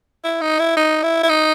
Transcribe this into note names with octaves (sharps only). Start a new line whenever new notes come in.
E4
D#4
E4
D#4
E4
E4
D#4